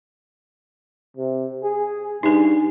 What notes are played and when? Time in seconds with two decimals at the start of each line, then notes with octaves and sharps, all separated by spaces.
1.17 C3
1.63 G#4
2.23 G2 D#4 G#5